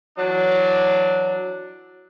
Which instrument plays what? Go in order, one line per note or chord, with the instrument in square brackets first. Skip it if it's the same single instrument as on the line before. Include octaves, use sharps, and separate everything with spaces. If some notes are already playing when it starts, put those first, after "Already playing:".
[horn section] E3 F#3 D4